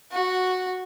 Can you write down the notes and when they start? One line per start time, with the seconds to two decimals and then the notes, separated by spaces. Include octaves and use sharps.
0.12 F#4